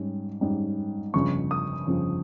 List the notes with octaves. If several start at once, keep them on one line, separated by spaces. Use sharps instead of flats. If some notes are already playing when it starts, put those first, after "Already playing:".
Already playing: G#2 G3 C#4
G#2 G3 C#4
G1 F2 C#3 F3 C#6
D#6
G1 F2 C#3 F3